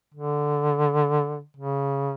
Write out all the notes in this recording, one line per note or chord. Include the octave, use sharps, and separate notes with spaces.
D3
C#3